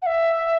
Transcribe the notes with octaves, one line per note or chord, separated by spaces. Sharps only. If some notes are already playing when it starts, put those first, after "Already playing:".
F#5
E5